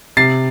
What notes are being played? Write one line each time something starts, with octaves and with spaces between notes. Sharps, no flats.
C3 A6 C7